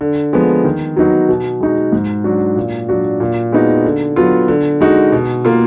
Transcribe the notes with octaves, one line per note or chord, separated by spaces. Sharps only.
D3
F3 G#3 B3
D#3
F#3 B3 D#4 F#4
B2
G#3 D#4 F#4
G#2
F#3 D4 F#4
A#2
F#3 D4 F#4
A#2
G#3 B3 D#4 F#4
D3
F#3 B3 F4
D3
G#3 D#4 F#4
B2
A#3 F4